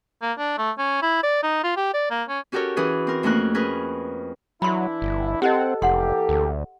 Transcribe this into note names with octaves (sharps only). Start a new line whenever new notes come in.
A#3
D4
A3
C#4
E4
D5
D#4
F4
G4
D5
A#3
C#4
C#4 F#4 G4 A4 A#4 C#5
E3 C#4 G#4 B4
C4 A#4
F2 A3 A#3 C#4 A#4 F#6
C#4 G#4 A#4 B4
E3 F#3 D4 E4 B5 C6
G1
C4 G4 A4 C5 D#5 F#5
F1 E3 A#3 G4 F#5 C6
D2